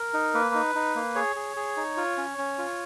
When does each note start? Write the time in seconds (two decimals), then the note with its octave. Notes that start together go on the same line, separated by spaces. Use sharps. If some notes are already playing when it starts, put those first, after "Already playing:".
Already playing: A#4
0.14 D#4
0.34 A#3 B4
0.55 D#4
0.75 D#4
0.96 A#3
1.15 G#4 C#5
1.36 G#4
1.56 G#4
1.77 D#4
1.97 F4
2.17 C#4
2.38 C#4
2.58 F4